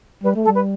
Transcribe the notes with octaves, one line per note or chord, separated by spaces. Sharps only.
G3 B4
A3
A4
G3
B4